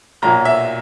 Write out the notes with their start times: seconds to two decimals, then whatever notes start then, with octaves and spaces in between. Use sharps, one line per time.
0.22 B1 A#2 F#3 A#5
0.45 E5